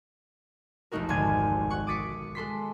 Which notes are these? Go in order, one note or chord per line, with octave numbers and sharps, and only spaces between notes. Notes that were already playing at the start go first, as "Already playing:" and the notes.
F1 B1 A3 D#4 F#4 A#4
G#1 D2 D4 G#5 G#6 D#7
F#5 C#6
D6 D#6 A6 B6 C#7
G#3 A4 C6 B6